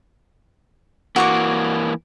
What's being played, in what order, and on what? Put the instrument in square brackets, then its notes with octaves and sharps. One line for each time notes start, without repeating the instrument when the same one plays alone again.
[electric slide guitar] E3 A#3 [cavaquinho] F#4 C#6 D6